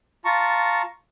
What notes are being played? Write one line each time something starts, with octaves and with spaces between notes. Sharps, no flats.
F4 A5 A#5 C#6